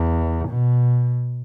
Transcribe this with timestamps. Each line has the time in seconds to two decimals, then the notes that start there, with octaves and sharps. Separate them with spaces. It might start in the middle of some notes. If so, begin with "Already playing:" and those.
Already playing: E2
0.48 B2